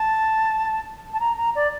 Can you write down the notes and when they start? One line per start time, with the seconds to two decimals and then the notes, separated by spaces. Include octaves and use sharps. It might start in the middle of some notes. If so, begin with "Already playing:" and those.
Already playing: A5
1.14 A5
1.20 A#5
1.38 A#5
1.55 D5